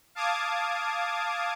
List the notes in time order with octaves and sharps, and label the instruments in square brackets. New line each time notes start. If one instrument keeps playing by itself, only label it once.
[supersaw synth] F5 A5 D6 D#6 G#6